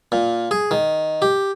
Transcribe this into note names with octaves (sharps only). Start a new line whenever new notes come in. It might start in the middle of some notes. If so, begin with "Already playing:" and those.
A#2
G#4
D#3
G4